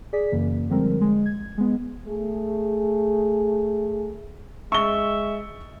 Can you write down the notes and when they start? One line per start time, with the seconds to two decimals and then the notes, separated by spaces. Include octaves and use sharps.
0.13 G#4 D5 B6
0.32 F#2 C#3 E3 A#3
0.69 D3 F3 G3 G#3 C4 A#4
1.01 G#3
1.26 G#6
1.58 G#3 B3
2.07 A3 G#4
4.72 G#3 E5 C#6 G7